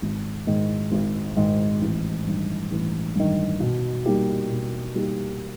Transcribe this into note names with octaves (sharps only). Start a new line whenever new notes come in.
G#1
G#2 D#3 G#3
G#1
G#2 D#3 G#3
A1
G2 D#3
A1
G2 D#3
B2
G3 A#3 D#4 G4
B2
G3 A#3 D#4 G4